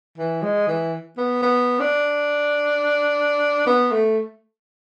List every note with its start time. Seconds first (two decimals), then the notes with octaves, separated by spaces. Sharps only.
0.18 E3
0.43 G#3
0.67 E3
1.18 B3
1.42 B3
1.80 D4
3.67 B3
3.92 A3